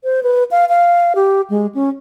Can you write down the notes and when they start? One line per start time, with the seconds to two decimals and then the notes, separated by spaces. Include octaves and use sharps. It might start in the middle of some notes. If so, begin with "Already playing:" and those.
0.04 C5
0.23 B4
0.51 F5
0.69 F5
1.15 G4
1.50 G#3
1.75 C#4